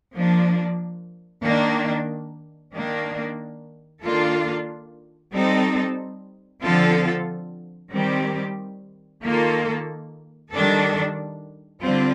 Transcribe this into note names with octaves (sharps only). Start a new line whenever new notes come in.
F3 A#3 D4
D#3 A#3 D4
D#3 A#3 D4
D#3 A#3 D4 F4 A4
G3 C4 D#4 A4
D3 F3 C4 F4 A4
D#3 G3 C4 G4
D#3 A#3 F4 A4
D#3 G3 D4 A4
D3 G3 C4 F4